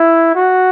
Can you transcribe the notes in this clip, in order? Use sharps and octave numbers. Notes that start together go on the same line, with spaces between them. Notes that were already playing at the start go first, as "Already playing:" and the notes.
Already playing: E4
F#4